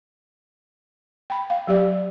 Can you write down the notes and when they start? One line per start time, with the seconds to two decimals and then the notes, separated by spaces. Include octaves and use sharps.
1.30 G5 B5
1.50 F5
1.67 F#3 G4 D5